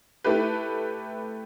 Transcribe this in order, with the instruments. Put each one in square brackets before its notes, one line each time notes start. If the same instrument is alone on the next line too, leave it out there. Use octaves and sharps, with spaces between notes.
[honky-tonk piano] A3 E4 G4 B4